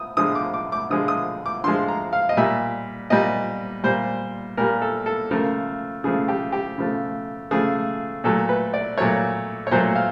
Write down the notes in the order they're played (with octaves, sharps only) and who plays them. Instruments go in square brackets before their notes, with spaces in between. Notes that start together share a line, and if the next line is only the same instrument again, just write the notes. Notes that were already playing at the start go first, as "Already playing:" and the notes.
Already playing: [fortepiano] D#6
D3 F3 G#3 D#6
D6
D6
D6
D3 F3 G#3 D#6
D#6
D6
D3 F3 G#3 C6
A#5
F5
D#5
A#2 G3 E5
A#2 G3 D#5
A#2 G3 C5
A#2 G3 A#4
A4
A4
C#3 F3 A3 A#4
C#3 F3 A3 G#4
G4
G4
C#3 F3 A3
C#3 F3 A3 G#4
A#2 F#3 A3 A4
B4
D5
A#2 F#3 A3 C#5
C#5
A#2 F#3 A3 C5
F5